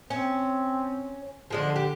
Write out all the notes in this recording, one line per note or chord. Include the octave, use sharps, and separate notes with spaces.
C4 C#4
D3 F3 G#3 D4
G4